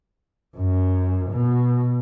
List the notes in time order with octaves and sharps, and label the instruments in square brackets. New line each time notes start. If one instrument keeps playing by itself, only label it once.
[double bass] F#2
B2